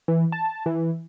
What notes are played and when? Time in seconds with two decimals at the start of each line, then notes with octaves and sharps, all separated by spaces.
0.08 E3
0.32 A5
0.66 E3